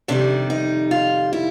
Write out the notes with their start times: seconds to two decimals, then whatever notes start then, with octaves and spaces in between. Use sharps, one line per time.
0.08 F2 C3 D#3 G3 D4
0.50 D#4
0.91 F4
1.33 E4